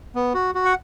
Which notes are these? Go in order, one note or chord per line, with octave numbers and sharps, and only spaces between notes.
B3
F#4
F#4
F#5